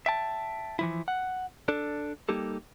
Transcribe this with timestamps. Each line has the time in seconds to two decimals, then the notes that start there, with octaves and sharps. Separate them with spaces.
0.06 E5 G5 A5
0.79 E3 F3 E4
1.08 F#5
1.68 D4 A4 D5
2.29 G3 A#3 D#4 G4 A4